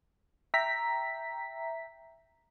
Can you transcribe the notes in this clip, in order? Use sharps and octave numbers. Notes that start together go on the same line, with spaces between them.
E5 G5 A#5 B6